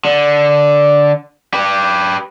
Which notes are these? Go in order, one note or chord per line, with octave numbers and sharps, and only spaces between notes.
D3
G4 B4